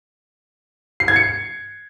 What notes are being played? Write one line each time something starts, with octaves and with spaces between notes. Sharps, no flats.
C7
G#6
C#7